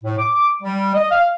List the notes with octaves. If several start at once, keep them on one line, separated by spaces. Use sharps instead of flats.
A2
D6
G3
D#5
F5